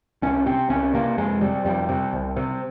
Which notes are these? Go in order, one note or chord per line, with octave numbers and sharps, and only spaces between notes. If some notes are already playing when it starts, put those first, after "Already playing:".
C2 C#4
C3 C4
C2 C#4
C3 A#3
F2 G#3
C3 G3
F2 G3
C3
C2
C3